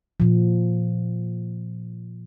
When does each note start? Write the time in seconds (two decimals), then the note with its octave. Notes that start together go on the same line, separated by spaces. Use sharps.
0.20 A#2 F3